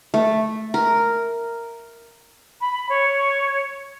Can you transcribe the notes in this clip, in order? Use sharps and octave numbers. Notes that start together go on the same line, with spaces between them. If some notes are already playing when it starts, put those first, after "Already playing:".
A3
A#4
B5
C#5